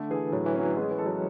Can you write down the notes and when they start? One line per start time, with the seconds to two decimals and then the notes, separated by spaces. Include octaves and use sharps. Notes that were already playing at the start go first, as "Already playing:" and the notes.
Already playing: D3 A3
0.11 E3 G#4
0.32 A2 F#3
0.46 E3
0.54 F#3 C#4
0.76 G#3 B3
0.91 E3
0.98 A4
1.06 F#3